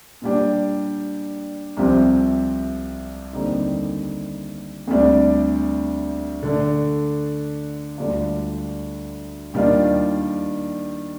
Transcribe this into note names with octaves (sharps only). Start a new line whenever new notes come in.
A#2 G3 D4 G4
C2 C3 F3 C4 G4
D#2 D3 G3 C4 D#4
D2 C3 G3 D4
D3 A3 D4
D2 D3 G3 D4 F4
D#2 D#3 G3 D4 F4